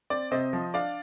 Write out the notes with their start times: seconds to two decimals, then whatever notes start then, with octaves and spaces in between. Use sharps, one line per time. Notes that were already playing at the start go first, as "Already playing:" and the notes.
0.10 C4 D5
0.31 C3 C5 D#5
0.53 F3
0.74 D4 D5 F5